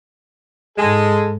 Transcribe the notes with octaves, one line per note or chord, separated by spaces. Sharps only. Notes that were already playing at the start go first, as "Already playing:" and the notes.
G#2 G#3 A4